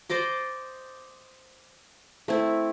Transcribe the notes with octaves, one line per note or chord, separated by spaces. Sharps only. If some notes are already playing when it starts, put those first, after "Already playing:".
C5 D5 D#5 D6
A3 C4 E4